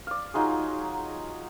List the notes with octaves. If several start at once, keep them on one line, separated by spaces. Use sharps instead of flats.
D5 F5
F#3 D#4 F4 G#4